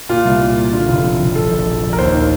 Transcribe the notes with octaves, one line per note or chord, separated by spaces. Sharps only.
A#2 F4
C2
A#2
A#2
D3 F4
F1
F2
F1
A#1 A4
A#1
A#1
A#1
A#4
D#2 C5
D#3